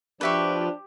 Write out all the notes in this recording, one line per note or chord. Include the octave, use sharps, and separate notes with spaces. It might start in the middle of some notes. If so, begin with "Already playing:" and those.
F3 D4 G4 B4 E5 C#6